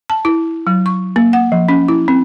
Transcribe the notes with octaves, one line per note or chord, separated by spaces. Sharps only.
A5
E4
F#3
C#6
A#3
F#5
F3
C#4
E4
C4